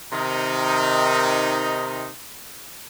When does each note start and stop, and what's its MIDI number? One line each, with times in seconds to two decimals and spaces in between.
0.12 2.09 48
0.12 2.09 51
0.12 2.09 63